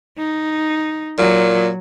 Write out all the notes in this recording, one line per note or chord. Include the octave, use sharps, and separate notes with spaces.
D#4
A#2 F#3